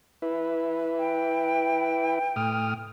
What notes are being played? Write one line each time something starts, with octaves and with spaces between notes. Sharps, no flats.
E4 B4
G5
A2 D#6 F6